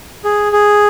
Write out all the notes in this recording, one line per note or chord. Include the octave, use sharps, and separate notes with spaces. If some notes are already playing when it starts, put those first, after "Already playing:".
G#4
G#4